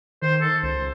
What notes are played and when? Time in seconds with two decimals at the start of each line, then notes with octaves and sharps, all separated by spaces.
0.22 D#3 C5
0.41 A4
0.63 C#2 C5